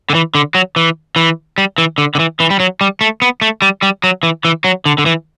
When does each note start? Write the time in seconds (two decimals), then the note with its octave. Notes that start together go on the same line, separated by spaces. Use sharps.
0.10 D3
0.15 E3
0.35 D3
0.55 F#3
0.76 E3
1.16 E3
1.58 G3
1.78 E3
1.98 D3
2.15 D3
2.19 E3
2.40 E3
2.50 G3
2.60 F#3
2.81 G3
3.01 A3
3.22 B3
3.41 A3
3.62 G3
3.82 G3
4.04 F#3
4.23 E3
4.45 E3
4.64 F#3
4.86 D3
4.98 D3
5.06 E3